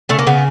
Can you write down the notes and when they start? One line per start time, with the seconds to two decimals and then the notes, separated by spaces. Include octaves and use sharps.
0.09 C#3 A3
0.19 A#3
0.27 C#3 B3